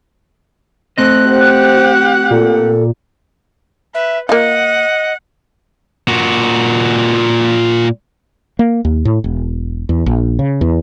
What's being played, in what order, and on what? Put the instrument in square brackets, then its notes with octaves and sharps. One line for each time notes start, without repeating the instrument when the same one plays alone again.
[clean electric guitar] A3 C4 D#5 [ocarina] C5 [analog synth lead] F#6
[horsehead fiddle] G4 F#5 [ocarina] C5
[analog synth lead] A#2 [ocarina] A4
[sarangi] B4 [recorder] E5
[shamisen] A#3 F4 [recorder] D#5 [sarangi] F#5
[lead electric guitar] A#2 F#4
[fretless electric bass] A#3
D#2
A2
E1
E2
A#1
C#3
E2